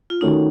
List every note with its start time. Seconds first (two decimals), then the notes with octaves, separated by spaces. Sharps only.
0.10 F4
0.21 D#3 A3 C#4 D#4 F#4